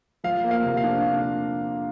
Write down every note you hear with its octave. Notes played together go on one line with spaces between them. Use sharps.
F3 F5
A#3
F5
C3
F5
D4